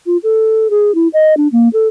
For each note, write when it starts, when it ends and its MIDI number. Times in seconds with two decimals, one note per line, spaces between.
0.06 0.17 65
0.23 0.68 69
0.70 0.94 68
0.95 1.08 64
1.13 1.34 75
1.37 1.48 62
1.52 1.68 58
1.73 1.88 69